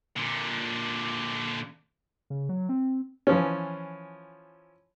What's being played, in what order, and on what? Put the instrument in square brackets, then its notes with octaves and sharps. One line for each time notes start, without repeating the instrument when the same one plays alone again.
[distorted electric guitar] A#2 D3
[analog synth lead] C#3
F#3
C4
[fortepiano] E3 F3 C#4